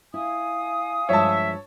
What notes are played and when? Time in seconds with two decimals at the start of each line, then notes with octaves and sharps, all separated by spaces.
0.14 E4 F5 G#5 D#6
1.09 G2 F3 G#3 C#5 E5 A5